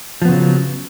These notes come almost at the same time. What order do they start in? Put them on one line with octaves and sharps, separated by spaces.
F3 B3 C#3 F#3